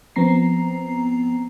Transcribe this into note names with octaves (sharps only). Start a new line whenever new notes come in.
F3 B3 C4 A#5 C7